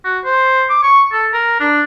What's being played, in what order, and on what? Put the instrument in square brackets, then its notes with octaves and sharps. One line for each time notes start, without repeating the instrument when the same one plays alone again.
[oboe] F#4
C5
D6
C#6
A4
A#4
D4